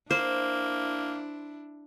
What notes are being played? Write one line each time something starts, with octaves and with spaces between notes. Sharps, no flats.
A#3 D4 E4 C5